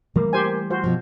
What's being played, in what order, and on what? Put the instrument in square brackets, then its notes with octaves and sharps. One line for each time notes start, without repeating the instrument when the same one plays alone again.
[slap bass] E3 G3 A3 [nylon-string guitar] A#3
[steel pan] G4 C5 G#5
F4 F#4 C5
[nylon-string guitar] B2 F3